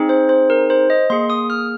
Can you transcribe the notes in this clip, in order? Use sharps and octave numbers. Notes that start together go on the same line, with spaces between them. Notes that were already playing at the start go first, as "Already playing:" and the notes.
Already playing: C4 D#4 G#4
C5
C5
A#4
C5
D#5
A#3 G#4 C6
D#6
F6